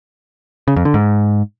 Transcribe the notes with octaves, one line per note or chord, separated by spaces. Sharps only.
C#3
F2
D3
G#2